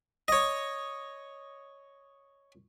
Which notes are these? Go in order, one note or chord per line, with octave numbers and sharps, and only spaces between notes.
C#5 D#5